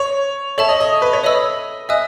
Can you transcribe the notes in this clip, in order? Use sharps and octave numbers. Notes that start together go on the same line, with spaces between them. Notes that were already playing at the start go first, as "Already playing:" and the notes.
Already playing: C#5
A4 C#5 E5 A5
D#5
D#5
B4
C#5
C#5 D#5 E5 B5 E6
D#5 E5 G#5 D#6 F#6